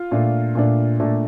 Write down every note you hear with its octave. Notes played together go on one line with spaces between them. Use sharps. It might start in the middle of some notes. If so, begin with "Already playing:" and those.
Already playing: F4 F5
A#2 A3 D4
A#2 A3 D4
A#2 A3 D4